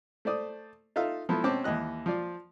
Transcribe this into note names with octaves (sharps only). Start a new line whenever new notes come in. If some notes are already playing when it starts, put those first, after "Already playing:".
A3 C5 D5 D#6
D#4 F4 A4 E5 F5
F3 B3 E4 A4
B2 C4 C#4 C5 A5 D6
D#2 E3 D#5 F#6
F3 F4 D5